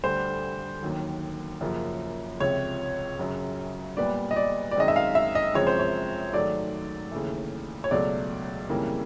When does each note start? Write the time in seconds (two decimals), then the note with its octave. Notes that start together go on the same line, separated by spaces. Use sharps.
0.03 D2 D3 G3 C5
0.83 D#2 D#3 F#3
1.61 F#2 C#3 F3 A#3
2.40 C#2 C3 F3 C#5
3.19 F#2 C#3 F#3
3.97 A#2 G3 B3 D5
4.31 D#5
4.36 D5
4.71 D5
4.76 F#2 D#3 G#3 C4 D#5
4.88 E5
4.96 F5
5.15 E5
5.35 D#5
5.54 F#2 C#3 F3 G#3 C4 C#5
5.67 C5
5.79 C#5
6.34 G#2 D#3 F#3 A3 D5
7.12 D#2 C#3 E3 A3
7.84 C#5
7.91 C#2 B2 F#3 A3 D5
8.69 F2 C#3 E3 G3 A#3